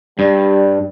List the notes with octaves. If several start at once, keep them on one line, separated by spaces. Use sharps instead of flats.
G2 G3 D5